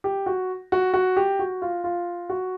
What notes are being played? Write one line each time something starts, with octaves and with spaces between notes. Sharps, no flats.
G4
F#4
F#4
F#4
G4
F#4
F4
F4
F#4